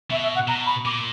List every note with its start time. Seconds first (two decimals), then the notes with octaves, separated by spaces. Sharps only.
0.11 B2 E5
0.23 E5
0.35 F#5
0.48 B2 A#5
0.66 B5
0.85 A#2 D6